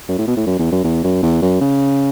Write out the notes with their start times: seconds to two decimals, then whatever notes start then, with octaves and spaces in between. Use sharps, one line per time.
0.08 F#2
0.18 A2
0.27 B2
0.37 A2
0.46 F#2
0.59 E2
0.71 F#2
0.84 E2
1.04 F#2
1.22 E2
1.42 F#2
1.61 C#3